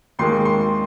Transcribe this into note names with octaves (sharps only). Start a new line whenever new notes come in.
D#2 D#3 G#3 C6
C6